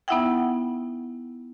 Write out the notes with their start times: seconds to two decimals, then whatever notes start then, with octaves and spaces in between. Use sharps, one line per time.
0.08 B3 D#4 E4 E5 F#5 G5